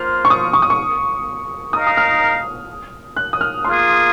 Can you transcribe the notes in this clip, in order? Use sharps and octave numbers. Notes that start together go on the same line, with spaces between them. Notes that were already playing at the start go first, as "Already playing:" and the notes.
Already playing: A#3 F4 C5 F6
C#6
D#6
C#6
D#6
C#6
D#4 A#4 F5 D#6
D#6
F6
F#6
D#6
F6
A#3 F4 G#4 C6